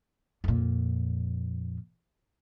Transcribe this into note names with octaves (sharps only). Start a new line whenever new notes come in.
F2 A#2